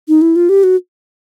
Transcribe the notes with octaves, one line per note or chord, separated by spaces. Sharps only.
D#4
E4
F4
G4
F#4